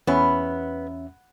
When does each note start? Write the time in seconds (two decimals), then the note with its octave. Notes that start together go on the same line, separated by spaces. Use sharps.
0.07 E2 B3 C#4 E5